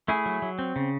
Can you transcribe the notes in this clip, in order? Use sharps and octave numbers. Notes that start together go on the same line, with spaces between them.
A3 E4 G#4
F#3
F#3
C4
C#3